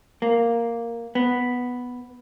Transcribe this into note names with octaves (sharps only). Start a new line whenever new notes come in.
A#3
B3